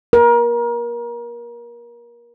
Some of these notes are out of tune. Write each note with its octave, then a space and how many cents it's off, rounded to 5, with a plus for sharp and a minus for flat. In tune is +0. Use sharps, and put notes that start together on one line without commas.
A#4 +30